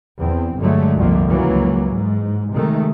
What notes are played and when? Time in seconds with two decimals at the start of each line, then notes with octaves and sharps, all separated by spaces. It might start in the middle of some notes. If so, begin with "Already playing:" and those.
0.19 E2 C4
0.59 G1 D3 F#3 G#3 A3
0.96 C2 F2 D3 F3 A3 A#3
1.28 C#2 E3 F#3 A#3
1.89 G#2
2.53 C3 D#3 G#3 A3